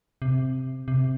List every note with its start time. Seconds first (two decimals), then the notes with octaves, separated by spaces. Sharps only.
0.22 C3
0.88 C3